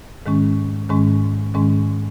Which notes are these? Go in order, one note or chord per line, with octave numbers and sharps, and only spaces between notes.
G#2 D#3 G#3 C#4
G#2 D#3 G#3 C#4
G#2 D#3 G#3 C#4